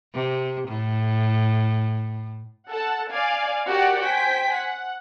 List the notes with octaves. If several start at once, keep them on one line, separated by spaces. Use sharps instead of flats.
C3
A2
A4 F#5 A5
D5 F5 G#5
F#4 G4 A#4 D5 F#5
C5 G5 G#5 B6
F#5